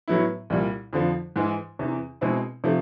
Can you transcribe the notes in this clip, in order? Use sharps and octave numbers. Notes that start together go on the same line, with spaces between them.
A2 F#3 B3 E4
C2 A#2 G3
F2 D3 F3
G#2 E3 G#3
E2 C3 E3
B2 G#3 C4 E4
C3 F3 A3